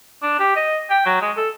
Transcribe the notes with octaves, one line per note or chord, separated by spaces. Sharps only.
D4
G4
D#5
G5
F#3
G#3
A4